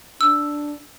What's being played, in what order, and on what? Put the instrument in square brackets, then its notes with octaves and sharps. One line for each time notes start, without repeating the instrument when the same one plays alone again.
[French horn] D4 [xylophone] E6